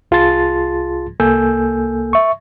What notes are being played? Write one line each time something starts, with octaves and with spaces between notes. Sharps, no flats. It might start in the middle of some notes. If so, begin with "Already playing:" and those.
C2 F4 G#4 A5 C6 A6
C2 A#3 A4 G#5 E6 G6
E5 C#6